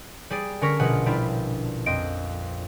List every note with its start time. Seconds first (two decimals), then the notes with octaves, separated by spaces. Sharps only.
0.30 G3 G#4 D5
0.61 D3 C#4 A#4 C#6 A#6 B6
0.80 A#1 B2 F#4 G#4 F#5
1.06 G3 D4 E4 F4
1.86 F2 C4 D#5 D7